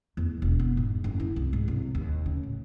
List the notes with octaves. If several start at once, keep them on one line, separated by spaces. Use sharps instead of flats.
E2
E1
B3
G#2
F#1
E4
C2
G#2
C2
D#2
C#3
A2